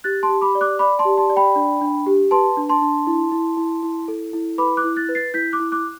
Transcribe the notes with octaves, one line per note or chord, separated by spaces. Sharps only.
G4 F#6 A6
A5 C6
G4
B5 D6
D5
D6 F#6
D5 B5 D6
A5 C6
G4
A5 C6
D5
G5 B5
D4
D4
G4
B4 A5 C6
D4
A5 C6
D4
E4
E4
E4
E4
A4
E4
B4 B5 D6
D6 F#6
E4
F#6 A6
B4
A6 C7
E4 G6 B6
D6 F#6
E4
D6 F#6